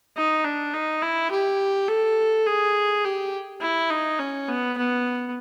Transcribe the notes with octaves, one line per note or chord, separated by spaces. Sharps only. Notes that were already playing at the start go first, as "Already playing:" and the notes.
D#4
D4
D#4
E4
G4
A4
G#4
G4
E4
D#4
C#4
B3
B3